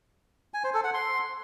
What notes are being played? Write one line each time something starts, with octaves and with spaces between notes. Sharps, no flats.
G#5
C5
A4
F#5
C6